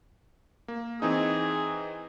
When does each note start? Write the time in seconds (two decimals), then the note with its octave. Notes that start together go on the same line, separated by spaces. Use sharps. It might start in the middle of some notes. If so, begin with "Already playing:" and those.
0.68 A#3
1.02 E3 C4 D#4 G#4